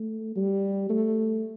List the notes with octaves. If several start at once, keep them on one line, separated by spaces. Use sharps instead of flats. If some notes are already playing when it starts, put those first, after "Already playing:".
Already playing: A3
G3
A3